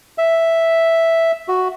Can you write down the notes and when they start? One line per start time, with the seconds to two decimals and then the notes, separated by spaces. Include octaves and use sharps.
0.18 E5
1.48 F#4